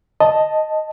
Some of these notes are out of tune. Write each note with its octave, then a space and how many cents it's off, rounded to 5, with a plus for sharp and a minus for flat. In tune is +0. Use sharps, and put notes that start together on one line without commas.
D#5 +0 A5 +0